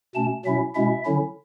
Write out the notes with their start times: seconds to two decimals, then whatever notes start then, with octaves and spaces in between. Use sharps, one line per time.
0.15 B2 A3 C#4 A5
0.45 B2 F#3 C#4 E4 E5
0.75 B2 G#3 C#4 E4 E5
1.04 D3 F#3 C#4 E4